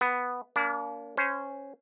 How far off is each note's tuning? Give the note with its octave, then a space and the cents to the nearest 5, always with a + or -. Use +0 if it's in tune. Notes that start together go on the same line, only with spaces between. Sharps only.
B3 +0 B4 +0
A#3 +0 D4 -45
C#4 -5 C5 -20